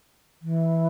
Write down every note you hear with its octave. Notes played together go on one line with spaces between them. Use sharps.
E3